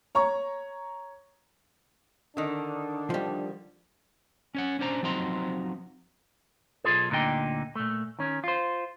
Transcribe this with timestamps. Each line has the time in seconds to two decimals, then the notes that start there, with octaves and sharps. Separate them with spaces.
0.15 C#5 A#5 C#6
2.37 D3 D#3 D4
3.10 F3 G3
4.55 C#4 C#5 F#5
4.79 C#4 D4 C5 A#5
5.03 F3 F#3 C4 D#4 A#5 C6
6.84 B1 F3 F4 G#4 A4
7.10 D2 A#2 D3 D#4 G5
7.76 A#2 A3
8.19 D#3 C#4
8.44 F4 C5